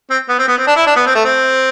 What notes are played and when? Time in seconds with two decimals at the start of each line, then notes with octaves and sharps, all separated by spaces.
0.10 C4
0.29 B3
0.38 C4
0.48 B3
0.58 C4
0.67 D4
0.76 E4
0.87 D4
0.96 B3
1.06 C4
1.15 A3
1.25 C4